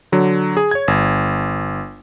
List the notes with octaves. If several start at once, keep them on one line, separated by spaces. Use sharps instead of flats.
D3 F#3
G#4
C#5 G#6
G1